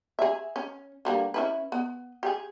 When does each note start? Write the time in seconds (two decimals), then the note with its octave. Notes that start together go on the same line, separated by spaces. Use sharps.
0.19 G#4 E5
0.56 C#4
1.05 D3 G3 A#3
1.34 C#4 E4 B4
1.72 B3
2.23 G4 G#4